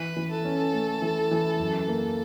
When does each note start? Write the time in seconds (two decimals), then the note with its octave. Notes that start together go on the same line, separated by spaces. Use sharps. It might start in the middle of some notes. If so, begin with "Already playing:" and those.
Already playing: E3 B4
0.17 E3
0.31 A4
0.45 C#4
0.73 A3
1.02 E3
1.31 E3
1.60 F#2
1.88 A#3